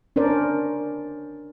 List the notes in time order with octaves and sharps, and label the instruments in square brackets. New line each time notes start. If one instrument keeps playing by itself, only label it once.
[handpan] C#4 D4 A#4 C5 D5